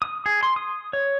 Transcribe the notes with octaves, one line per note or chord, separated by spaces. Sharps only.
D#6
G#4
C6
D#6
C#5